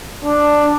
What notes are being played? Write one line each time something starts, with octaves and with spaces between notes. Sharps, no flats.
D4